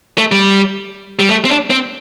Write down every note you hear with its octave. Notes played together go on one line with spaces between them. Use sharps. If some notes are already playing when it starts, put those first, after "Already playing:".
A3
G3
G3
A3
C4
D4
C4